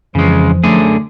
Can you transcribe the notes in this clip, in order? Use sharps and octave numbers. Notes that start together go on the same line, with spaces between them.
F2 C#3 E3 F3 G#3
F#2 D3 A3 G#4